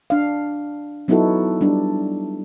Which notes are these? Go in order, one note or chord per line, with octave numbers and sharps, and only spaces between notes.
D4 F5
F#3 B3 D#4 E4 F#4 A4
G3 D4